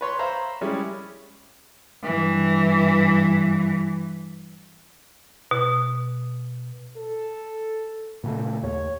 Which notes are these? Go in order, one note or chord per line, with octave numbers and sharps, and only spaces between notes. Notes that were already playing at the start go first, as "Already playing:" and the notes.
B4 C#5 C6
C5 E5 F5 A#5 B5
G3 G#3 C#4 E4
G2 E3
B2
A4
A#2 C#3 A3
D#2 C#5